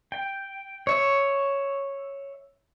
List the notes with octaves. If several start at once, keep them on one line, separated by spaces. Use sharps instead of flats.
G5
C#5 E5